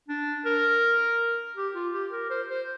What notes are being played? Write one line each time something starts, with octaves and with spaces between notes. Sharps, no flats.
D4
A#4
G4
F4
G4
A#4
C5
C5